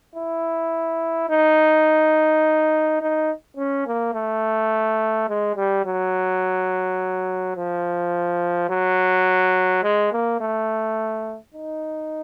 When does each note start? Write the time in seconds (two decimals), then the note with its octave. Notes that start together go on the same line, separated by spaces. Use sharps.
0.16 E4
1.30 D#4
3.01 D#4
3.57 C#4
3.87 A#3
4.14 A3
5.29 G#3
5.56 G3
5.86 F#3
7.57 F3
8.70 F#3
9.83 G#3
10.12 A#3
10.41 A3
11.54 D#4